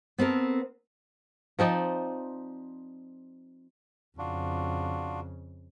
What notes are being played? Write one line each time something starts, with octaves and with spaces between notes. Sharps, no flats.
B3 C4 A4 A#4
F3 C4 D#4 D5
F2 C#3 D4 F4 F#4